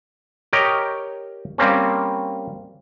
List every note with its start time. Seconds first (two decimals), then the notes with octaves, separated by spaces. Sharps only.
0.53 G4 A#4 C#5 D#5 G5
1.58 G3 A#3 C4 C#4